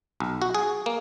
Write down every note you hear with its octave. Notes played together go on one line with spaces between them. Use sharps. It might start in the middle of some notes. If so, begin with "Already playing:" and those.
B1
F#4
G#4
A#3